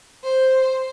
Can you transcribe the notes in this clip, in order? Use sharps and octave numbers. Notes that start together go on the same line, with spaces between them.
C5